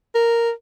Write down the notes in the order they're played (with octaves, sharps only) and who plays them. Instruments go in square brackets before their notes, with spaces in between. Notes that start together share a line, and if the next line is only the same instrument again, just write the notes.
[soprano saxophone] A#4